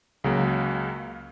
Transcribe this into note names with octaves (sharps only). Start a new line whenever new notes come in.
C#2 C#3 F#3 A#3